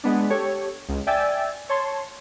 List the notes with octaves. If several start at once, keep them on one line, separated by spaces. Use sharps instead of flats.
G#3 B3 D4
G4 A4 C#5
C#2
D5 E5 G5 G#5 E6 A6
C#5 A5 C6